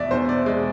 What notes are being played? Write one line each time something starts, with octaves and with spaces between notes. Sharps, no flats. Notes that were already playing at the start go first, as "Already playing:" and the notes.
Already playing: E2 B2 D5 E5
E2 C5
D5
G#3 D5